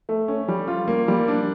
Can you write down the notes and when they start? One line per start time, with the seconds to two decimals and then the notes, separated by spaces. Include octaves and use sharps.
0.09 A3
0.28 C#4
0.48 G3
0.68 F4
0.88 A#3
1.08 G3
1.28 D4